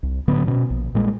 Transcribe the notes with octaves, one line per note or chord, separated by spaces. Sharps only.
C2
A2 D3 F#3 B3
B2 C#4
A#1
A#2 G3 G#3